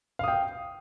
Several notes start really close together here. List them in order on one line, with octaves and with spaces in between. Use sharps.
F5 D#6 G5